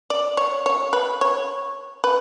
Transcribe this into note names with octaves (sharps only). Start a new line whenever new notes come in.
D5
C#5
C#5
B4
C#5
B4